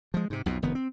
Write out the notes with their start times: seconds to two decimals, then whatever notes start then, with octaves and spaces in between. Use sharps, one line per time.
0.14 F3 G#3
0.30 G#2 C3
0.46 B1 F2 B2
0.62 F1 D#3 B3
0.75 C4